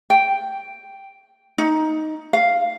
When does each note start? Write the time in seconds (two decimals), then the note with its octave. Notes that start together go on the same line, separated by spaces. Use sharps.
0.10 G5
1.58 D#4
2.33 F5